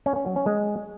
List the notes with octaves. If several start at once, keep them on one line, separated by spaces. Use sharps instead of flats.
C#4
C#4
F#3
C#4
G#3